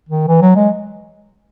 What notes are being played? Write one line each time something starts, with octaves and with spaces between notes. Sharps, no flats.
D#3
E3
F#3
G#3